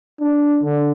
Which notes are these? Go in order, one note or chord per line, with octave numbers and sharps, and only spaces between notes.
D4
D3